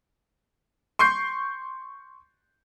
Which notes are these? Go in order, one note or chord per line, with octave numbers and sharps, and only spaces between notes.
C6 C#6 G6 C7